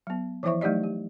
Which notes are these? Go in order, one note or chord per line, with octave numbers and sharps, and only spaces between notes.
F#3 B3
E3 F3 E4 C5 E5 C#6
F#3 A3 D#4 G4 D5 D#5
G4